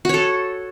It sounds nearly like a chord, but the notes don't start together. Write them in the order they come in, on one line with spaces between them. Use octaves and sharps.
F#4 C#5 A4